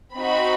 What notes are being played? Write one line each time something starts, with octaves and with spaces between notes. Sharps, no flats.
C4 D#4 F#4 B5